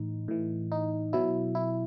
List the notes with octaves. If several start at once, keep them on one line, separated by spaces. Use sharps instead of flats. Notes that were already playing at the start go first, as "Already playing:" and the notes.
Already playing: A2 E3 D#4
A2 E3
D#4
B2 F#3 E4
E4